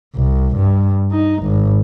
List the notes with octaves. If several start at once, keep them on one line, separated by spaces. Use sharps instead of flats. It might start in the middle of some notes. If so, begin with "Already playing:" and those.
C2
G2
D#4
G#1